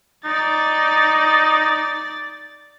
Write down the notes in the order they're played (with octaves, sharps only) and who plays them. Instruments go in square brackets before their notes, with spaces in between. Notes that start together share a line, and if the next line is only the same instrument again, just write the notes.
[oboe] D#4 [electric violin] D5 A6